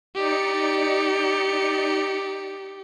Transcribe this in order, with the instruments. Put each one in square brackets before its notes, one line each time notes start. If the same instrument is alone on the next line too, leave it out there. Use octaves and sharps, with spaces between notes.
[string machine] D#4 D5 C#7 [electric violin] G4